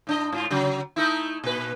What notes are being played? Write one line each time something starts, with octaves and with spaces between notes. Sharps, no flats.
A2 D4 D#5
G#2 F4
C#3 F#3
A3 D#4 E4
A#2 B4